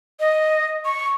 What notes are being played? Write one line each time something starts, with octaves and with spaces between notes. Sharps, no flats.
D#5
C#6